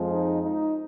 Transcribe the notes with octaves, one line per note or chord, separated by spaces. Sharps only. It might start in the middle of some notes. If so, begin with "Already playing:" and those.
Already playing: F2 F3 G#3
D#4
D#4